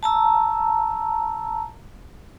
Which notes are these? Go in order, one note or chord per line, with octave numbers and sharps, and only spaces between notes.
A5 A#5 E6